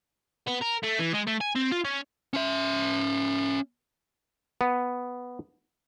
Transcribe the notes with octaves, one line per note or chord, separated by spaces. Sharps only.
B3
A#4
A3
E3
G#3
A3
G#5
C4
F4
C#4
C#4 E5
B3